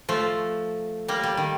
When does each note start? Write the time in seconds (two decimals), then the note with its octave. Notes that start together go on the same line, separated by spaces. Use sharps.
0.09 F3 A3
1.08 G3 A#3
1.23 G3
1.37 D#3